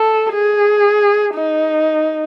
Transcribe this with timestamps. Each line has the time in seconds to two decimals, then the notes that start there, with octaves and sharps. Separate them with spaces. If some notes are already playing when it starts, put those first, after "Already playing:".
Already playing: A4
0.33 G#4
1.35 D#4